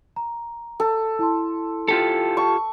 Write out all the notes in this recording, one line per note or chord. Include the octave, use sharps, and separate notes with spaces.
A#5
A4
E4 A5 C6
F4 G4 A4
A5 C#6